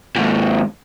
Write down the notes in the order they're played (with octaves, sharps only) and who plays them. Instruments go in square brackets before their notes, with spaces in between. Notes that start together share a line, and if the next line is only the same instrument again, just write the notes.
[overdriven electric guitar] D#2 G#2